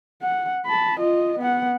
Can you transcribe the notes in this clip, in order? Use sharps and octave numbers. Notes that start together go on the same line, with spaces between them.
F#5
A5 B5
F4 D#5
B3 F#5